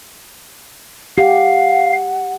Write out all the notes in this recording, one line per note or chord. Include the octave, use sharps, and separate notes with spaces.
G4 F5 F#5